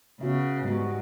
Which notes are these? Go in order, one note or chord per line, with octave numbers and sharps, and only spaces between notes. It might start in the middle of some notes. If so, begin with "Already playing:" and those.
C#3 B3 F#4 E5
G#2 G3 B3 F#4